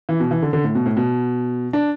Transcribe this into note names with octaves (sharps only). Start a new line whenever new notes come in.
E3
B2
E3
D3
D3
A2
B2
A2
B2
D4